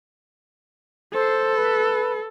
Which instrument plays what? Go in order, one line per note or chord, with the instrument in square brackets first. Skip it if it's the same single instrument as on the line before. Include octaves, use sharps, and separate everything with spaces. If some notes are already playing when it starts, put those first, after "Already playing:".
[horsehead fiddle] A4 [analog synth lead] C5
[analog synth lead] B4